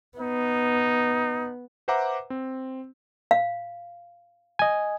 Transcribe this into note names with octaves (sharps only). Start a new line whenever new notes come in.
B3 D#4
B4 C5 E5 F#5 A#5 D6
C4
F5
D#5 G#5